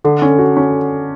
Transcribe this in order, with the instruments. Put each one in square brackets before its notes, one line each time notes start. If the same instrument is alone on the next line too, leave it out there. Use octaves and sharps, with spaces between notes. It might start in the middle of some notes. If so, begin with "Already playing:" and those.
[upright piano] D3 [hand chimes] A4
[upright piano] C#4
F#4
C#4